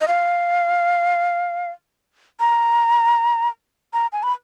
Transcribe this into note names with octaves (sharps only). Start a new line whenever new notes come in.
D#5
F5
A#5
A#5
G#5
B5